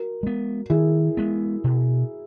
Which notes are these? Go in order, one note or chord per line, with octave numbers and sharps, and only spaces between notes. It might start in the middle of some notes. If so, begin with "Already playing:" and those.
Already playing: F#4 A#4
G#3 B3
D#3 E4 G#4
G#3 B3
B2